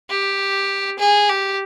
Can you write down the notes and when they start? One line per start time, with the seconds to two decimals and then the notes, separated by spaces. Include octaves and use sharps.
0.10 G4
0.99 G#4
1.29 G4